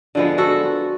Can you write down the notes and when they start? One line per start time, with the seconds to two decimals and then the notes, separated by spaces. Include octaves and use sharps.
0.15 D3 F3 G#3 B3
0.38 F#4 A4